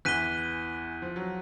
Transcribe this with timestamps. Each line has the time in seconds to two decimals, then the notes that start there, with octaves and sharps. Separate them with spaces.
0.05 E2 E3 F#6 B6 D#7 G7
1.02 F3
1.16 F#3